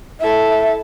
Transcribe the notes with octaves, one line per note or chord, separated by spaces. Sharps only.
E4 A4 E5